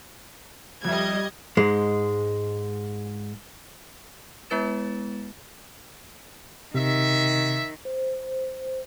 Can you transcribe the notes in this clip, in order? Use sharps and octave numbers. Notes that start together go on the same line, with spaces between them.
F2 G3 D#5 E5 G#6
G#2 G#3
G#3 B3 E4 B4 A6 E7
C3 D#3 E5
C5